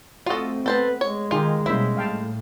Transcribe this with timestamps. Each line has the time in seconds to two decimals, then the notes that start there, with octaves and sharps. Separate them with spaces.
0.26 A3 C4 F4 F#4 A4 D#5
0.66 B3 A4 B4 C5 A5
1.01 G#3 C#5
1.31 D#3 D#4 F4 G4 G#4
1.66 B2 G3 A#3 C#4 E4 C5 E5
1.97 A2 F5 G5 A5